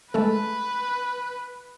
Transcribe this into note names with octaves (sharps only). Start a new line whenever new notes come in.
G#3 A3 A4 B4